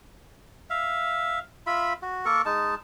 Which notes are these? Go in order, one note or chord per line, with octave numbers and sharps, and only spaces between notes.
E5 F5
F4 E5 B5
F#4
A#3 A4 A#4 C#6
G#3 D#4 A5